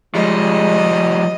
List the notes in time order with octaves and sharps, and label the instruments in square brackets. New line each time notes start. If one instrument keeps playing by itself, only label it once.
[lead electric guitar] F3 G3 [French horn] G#3 [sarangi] D#5